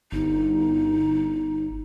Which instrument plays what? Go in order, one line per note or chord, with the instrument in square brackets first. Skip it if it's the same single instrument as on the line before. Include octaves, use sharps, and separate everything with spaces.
[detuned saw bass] G1 [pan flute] D#4